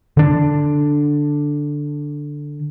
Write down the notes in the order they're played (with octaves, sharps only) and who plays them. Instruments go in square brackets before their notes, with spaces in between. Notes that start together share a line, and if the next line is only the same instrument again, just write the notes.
[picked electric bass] D3 D4